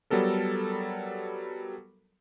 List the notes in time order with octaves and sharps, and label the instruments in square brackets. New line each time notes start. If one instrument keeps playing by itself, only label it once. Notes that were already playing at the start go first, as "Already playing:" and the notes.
[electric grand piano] F#3 G3 B3 A4 A#4